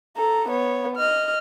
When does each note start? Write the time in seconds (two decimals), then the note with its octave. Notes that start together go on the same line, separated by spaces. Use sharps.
0.17 A4 A#5
0.49 B3 C#5
0.96 D#5 F6